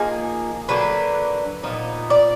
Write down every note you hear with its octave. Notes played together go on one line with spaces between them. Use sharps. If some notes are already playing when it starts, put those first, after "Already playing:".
Already playing: F3 A#3 D#4 G#4
D3 F#3 A#3 D4 B4
A#2 F3 B3 D#4
D5